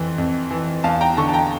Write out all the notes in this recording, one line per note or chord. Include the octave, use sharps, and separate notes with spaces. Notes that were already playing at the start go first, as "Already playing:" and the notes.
Already playing: F2 E3
F2
E3
E2 F5 A5
G5 A#5
D3 A5 C#6
A5
G5 A#5